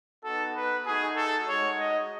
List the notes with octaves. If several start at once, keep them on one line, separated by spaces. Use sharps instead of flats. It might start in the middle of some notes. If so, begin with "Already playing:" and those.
B3 D#4 F#4 A4
B4
A3 D#4 F#4 G#4
A4
G#3 D#4 F#4 C#5
D#5